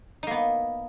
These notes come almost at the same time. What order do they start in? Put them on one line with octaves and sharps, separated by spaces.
D#4 A#3 B3